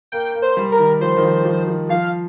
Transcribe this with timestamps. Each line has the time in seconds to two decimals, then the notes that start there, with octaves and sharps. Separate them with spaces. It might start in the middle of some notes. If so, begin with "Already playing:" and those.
0.12 A#3 G5
0.35 A#3
0.42 C5
0.57 G3
0.72 A#4
0.79 D#3
1.01 F3 C5
1.17 D#3
1.23 F3
1.45 F3
1.67 F3
1.89 F3 F5